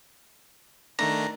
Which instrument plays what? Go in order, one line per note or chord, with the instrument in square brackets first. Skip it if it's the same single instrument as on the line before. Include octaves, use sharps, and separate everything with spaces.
[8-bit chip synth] D#3 A3 D4 [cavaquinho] A#5